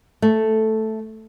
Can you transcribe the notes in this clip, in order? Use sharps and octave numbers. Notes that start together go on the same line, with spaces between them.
A3